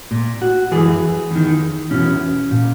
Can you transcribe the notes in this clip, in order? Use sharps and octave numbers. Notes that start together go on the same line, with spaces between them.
A#2
F#4
F#2 E3 G#4
E2 D#3
E2 B2 C#4
A#2